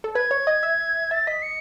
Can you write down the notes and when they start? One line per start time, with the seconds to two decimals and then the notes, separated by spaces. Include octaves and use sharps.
0.04 A4
0.15 B4 G#6
0.31 C#5
0.47 D#5
0.63 E5
1.11 E5 A6
1.27 D#5 B6
1.43 C#7